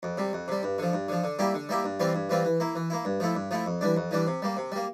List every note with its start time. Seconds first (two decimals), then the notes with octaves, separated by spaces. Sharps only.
0.03 F2
0.18 C3 G3
0.33 F2
0.48 C3 G3
0.63 G2
0.78 D3 F3
0.93 G2
1.09 D3 F3
1.24 D3
1.39 G3 A#3 E4 G4
1.54 D3
1.69 G3 A#3 E4 G4
1.84 G2
2.00 E3 G3 C4 F4
2.15 G2
2.29 E3 G3 C4 F4
2.45 E3
2.60 A#3 E4
2.75 E3
2.90 A#3 E4
3.05 G2
3.20 F3 A3 E4
3.35 G2
3.51 F3 A3 E4
3.66 F2
3.81 E3 G3 D4
3.97 F2
4.11 E3 G3 D4
4.27 C3
4.42 G3 A#3
4.57 C3
4.72 G3 A#3